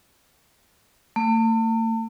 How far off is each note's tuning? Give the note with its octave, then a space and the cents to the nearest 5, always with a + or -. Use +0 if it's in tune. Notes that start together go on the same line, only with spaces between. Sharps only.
A3 +40